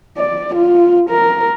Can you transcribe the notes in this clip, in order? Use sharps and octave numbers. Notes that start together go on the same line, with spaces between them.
D5
F4
A#4